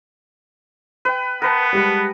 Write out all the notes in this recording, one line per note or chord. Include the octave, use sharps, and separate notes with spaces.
B4 G5
B3 A#4 B4 A5
G3 G#3 C#7